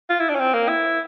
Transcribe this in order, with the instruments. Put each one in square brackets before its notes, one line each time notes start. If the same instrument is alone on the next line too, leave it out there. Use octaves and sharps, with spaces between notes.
[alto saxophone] F4
E4
D4
C#4
C4
A#3
E4